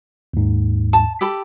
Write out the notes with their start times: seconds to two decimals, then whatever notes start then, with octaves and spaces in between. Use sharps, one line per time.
0.34 D#2 G#2
0.93 A5
1.21 G4 A4 B5